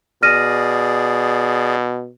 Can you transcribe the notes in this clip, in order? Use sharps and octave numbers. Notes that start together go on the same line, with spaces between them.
B2 G#4 D5 F6 A#6 D#7